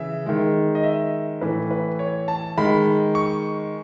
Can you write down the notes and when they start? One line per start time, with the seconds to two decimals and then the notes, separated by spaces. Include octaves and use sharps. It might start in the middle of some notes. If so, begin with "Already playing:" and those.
Already playing: C#3 E3 E5
0.26 D#3 G#3
0.75 D#5
0.83 E5
1.41 A2 E3 A3 B4
1.71 B4
1.99 C#5
2.28 A5
2.57 D#3 G#3 B5
3.15 C#6